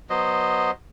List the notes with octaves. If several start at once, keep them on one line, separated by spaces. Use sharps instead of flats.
F#3 B3 C5 D#5